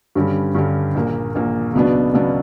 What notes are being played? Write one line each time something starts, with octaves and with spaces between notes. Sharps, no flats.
G2 D3 G3 C#4 G4
G2 D3 G3 C#4 G4
A#1 A#2 A#3
A#1 A#2 A#3
C#2 B2 F#3 B3 D4
C#2 B2 F#3 B3 D4